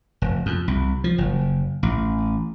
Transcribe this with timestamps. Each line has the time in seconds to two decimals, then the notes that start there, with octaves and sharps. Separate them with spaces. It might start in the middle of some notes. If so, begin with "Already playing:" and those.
0.22 F1
0.46 F2
0.68 C2
1.04 F3
1.18 F#1
1.83 A1